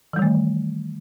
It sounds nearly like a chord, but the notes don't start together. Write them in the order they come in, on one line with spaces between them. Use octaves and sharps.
E3 G3 D#3 A3